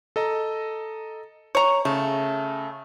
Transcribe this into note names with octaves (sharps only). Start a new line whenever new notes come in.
A4 D#5 A#5
C#5 A#5
C#3 A3